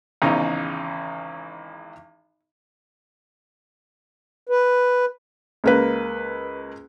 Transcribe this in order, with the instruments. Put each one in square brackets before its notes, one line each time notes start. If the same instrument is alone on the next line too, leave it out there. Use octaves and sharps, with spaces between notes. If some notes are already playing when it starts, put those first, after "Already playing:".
[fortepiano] G#1 E2 C#3 D#4
[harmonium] B4
[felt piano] C#2 A#3 B4